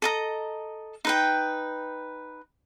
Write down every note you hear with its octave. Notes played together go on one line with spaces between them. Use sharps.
A4 D#5 A#5
D#4 B4 G5